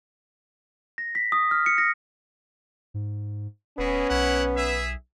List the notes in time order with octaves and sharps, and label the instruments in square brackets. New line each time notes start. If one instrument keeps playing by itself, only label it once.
[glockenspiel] A#6
B6
D#6
F6
C#7
A#6
[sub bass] G#2
[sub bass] D#1 [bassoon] B3 [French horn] C#4 [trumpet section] E4 F#4 G#4
[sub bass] B1 [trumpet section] E4 C#5 F#5
[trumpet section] G#4 E5